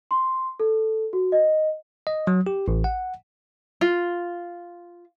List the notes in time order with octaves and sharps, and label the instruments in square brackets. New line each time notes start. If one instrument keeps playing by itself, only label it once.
[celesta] C6
A4
F#4
D#5
[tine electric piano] D#5
F#3
G4
A1
F#5
[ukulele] F4